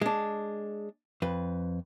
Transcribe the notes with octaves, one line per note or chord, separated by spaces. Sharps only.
G#3 D4
F2 B4